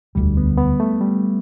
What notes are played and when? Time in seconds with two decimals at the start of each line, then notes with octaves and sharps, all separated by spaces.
0.15 E1 D2 D3 G3
0.37 B3
0.58 B3
0.80 A3
1.01 G3